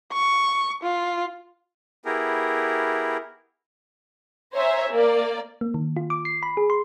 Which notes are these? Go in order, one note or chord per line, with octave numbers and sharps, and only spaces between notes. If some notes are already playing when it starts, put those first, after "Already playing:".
C#6
F4
B3 E4 G4 G#4 A#4
C5 C#5 E5 G#5 A#5
A#3 D5
A#3
D#3
F4
D6
C7
B5
G#4
C6